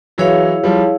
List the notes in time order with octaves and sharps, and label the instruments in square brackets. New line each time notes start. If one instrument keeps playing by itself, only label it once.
[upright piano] E3 F#3 [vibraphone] E4 G#4 C#5 F5
[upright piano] F3 G3